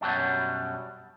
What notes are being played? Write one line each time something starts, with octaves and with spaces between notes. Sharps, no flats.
F#2 B2 F#3 G3 D4